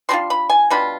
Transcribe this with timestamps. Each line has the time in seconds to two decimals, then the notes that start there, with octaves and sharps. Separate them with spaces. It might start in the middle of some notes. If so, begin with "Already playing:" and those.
0.09 B2 G3 D4 F4 C6
0.30 B5
0.50 G#5
0.70 B2 G3 D4 F4 B5